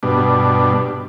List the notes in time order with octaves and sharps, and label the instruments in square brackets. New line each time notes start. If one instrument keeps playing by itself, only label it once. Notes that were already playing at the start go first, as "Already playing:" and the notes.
[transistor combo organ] G2 B2 D4